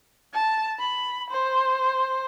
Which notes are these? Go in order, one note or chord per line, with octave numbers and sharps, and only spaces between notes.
A5
B5
C5